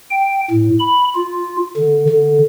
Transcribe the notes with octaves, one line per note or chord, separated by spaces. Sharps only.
G5
A2
B5
F4
D3
D3